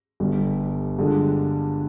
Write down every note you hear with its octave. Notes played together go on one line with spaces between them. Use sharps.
G1 G2 D3 G3
G2 D3 G#3 D4 F4